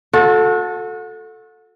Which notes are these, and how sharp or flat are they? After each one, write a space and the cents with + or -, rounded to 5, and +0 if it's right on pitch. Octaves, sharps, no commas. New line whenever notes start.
F#4 -35 A4 +0